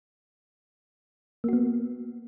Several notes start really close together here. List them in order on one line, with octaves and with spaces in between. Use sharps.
A#3 F#4 B3